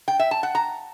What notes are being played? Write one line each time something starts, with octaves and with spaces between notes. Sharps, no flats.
G5
E5
A5
F#5
A#5